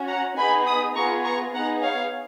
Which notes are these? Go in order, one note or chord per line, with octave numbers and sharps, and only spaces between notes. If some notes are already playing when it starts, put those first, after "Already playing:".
Already playing: C#4 F#4
F#5 A#5
B3 D#4 G#4 G#5 B5
B5 D#6
B3 F4 G#4 A#5 C#6
A#5 C#6
B3 D#4 G#4 F#5 A#5
C#5 F5